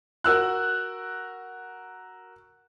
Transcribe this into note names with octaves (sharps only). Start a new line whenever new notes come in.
F#4 A#4 E6 F#6